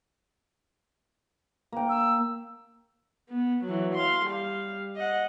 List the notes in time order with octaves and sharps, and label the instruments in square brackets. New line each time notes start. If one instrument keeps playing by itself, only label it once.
[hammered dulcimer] A#3 G5
[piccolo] E6
[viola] B3
E3 F#3
F5 C6
G3 F5
D#5 F#5